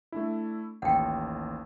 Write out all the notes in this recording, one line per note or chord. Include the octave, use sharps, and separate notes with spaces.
A3 D4 E4
A1 D#2 F#5 G5